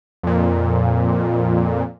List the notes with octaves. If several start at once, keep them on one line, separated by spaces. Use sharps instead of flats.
F2 A#2